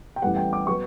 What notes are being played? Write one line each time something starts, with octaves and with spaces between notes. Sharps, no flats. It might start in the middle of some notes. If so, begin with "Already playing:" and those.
G5
A1 A2 G3 B3 F#5
G5
D6
F#3 B3 C#6